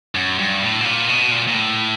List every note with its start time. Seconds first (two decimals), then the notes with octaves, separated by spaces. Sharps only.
0.15 F#2
0.39 G2
0.63 A2
0.81 B2
0.85 A#2
1.09 B2
1.32 A#2
1.47 A#2
1.54 A2